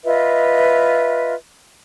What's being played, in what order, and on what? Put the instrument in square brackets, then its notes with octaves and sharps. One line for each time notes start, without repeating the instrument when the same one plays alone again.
[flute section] F4 B4 D#5 E5